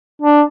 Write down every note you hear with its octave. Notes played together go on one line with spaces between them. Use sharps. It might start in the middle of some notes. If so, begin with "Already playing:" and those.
D4